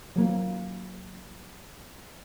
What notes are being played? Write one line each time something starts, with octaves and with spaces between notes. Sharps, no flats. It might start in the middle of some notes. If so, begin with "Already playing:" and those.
F#3 A#3